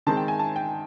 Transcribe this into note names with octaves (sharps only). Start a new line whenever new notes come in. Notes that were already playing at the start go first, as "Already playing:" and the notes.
D#3 G#3 C4 A5
G5
G#5
A5
G5